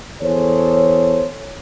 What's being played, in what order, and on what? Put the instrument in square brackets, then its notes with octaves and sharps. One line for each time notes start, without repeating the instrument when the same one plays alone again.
[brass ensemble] E2 G#4 A4 C5 C#5